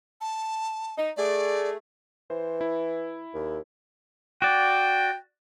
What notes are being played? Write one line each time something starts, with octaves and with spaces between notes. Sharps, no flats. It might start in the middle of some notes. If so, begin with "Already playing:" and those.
A5
D#4
A3 G#4 D5
E3 C5
E4
D#2
F#4 D5 G5